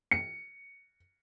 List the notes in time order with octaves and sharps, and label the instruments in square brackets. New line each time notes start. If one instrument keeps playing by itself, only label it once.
[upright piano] C#7